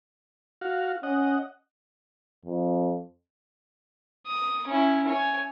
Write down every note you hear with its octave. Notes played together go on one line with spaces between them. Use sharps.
F#4 F5
C#4 D#5 F#5
F2
D#6
C#4 E4
C#5 G#5